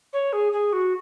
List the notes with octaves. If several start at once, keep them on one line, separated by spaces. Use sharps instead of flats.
C#5
G#4
G#4
F#4